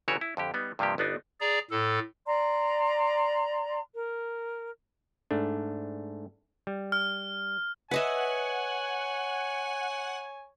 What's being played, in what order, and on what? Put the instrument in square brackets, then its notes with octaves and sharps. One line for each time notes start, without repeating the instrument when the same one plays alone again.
[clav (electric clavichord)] G1 C#3 E3 F#4 G4 C#5
E4
F2 D3 G4
G3 B3 D#4
G2 C3 F3 A#3 G4
G1 B3 D4 D#4
[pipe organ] G#4 D5 A#5
A2 A4
[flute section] D5 A#5 C6
A#4
[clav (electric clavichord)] G#2 A3 D4
G3
[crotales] F6
[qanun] B4 D#5 E5 [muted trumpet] C#5 [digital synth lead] F#5 [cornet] G#5